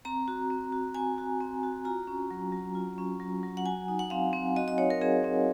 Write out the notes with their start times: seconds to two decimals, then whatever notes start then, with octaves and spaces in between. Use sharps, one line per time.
0.05 C4 A#5
0.28 F#4
0.50 C4
0.72 F#4
0.95 C4 G#5
1.18 F#4
1.41 C4
1.63 F#4
1.85 F4 A#5
2.07 C#4
2.31 F#3
2.52 F#3
2.75 F4
2.98 C#4
3.20 F#3
3.43 F#3
3.57 F#5
3.66 F#4 G#5
3.88 D#4
3.99 F#5
4.10 C4 F5
4.33 C4
4.56 F#4 D#5
4.68 D#5
4.78 D#4 C#5
4.90 A#4
5.01 C4 G#4
5.24 C4